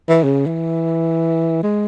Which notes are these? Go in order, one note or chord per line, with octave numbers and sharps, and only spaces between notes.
E3
C#3
E3
G#3